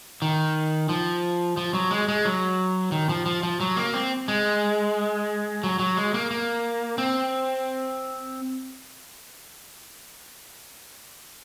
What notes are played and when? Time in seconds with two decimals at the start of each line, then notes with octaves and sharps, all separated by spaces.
0.22 D#3
0.89 F3
1.57 F3
1.74 F#3
1.91 G#3
2.08 G#3
2.25 F#3
2.92 D#3
3.09 F3
3.26 F3
3.43 F3
3.60 F#3
3.77 A#3
3.94 C4
4.28 G#3
5.63 F#3
5.79 F#3
5.97 G#3
6.14 A#3
6.31 A#3
6.98 C4